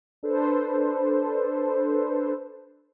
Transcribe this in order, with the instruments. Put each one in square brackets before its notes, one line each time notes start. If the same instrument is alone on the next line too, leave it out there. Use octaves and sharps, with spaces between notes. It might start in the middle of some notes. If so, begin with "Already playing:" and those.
[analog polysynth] D4 A4 B4 C5